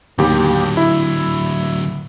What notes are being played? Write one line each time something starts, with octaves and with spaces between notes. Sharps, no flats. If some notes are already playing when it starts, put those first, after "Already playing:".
D#2 D3 F#3 G4
E4